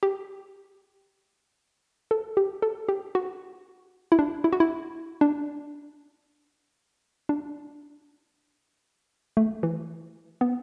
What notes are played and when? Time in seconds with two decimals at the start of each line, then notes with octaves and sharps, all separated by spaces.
0.03 G4
2.11 A4
2.37 G4
2.62 A4
2.89 G4
3.15 F#4
4.12 E4
4.19 D4
4.44 E4
4.53 F#4
4.60 E4
5.21 D4
7.29 D4
9.37 A3
9.63 E3
10.41 B3